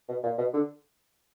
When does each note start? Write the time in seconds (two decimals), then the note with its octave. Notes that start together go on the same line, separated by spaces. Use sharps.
0.09 B2
0.24 A#2
0.38 B2
0.54 D3